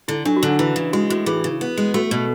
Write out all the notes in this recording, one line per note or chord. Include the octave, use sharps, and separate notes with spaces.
D3 E4
F#3 D4
F#4
D3
D4
E3 E4
C#3
G#3 F#4
A2 F#4
E3 G#4
C#3
B3
G#3
A3 F#4
B2